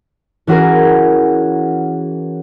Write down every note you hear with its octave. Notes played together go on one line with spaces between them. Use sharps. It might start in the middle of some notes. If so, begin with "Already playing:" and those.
E3 C#4 F#4 G#4 A#4